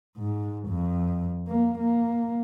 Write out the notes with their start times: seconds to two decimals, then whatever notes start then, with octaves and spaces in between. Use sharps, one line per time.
0.18 G#2
0.69 F2
1.48 A#3
1.79 A#3